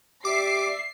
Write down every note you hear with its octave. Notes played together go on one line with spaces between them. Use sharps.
G4 D5 E5 D6 C7